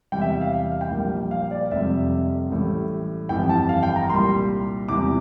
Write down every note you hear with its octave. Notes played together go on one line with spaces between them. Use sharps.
E2 C3 G3 G5
E5
F5
F5
F5
G5
A#1 A#2 G3
F5
D5
F1 F2 C3 G3 E5
A1 A2 G3
G1 F2 E3 G3 G5
A5
F5
G5
A#5
C2 A#2 G3 C6
E2 C3 E3 G3 D6